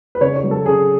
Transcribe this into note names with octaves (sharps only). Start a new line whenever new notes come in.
B4
C#3 C#5
C#5
F#3
A4
C#3 G#4